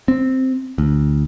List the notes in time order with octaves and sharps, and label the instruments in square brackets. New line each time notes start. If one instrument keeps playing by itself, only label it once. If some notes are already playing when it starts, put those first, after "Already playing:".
[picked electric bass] C4
D2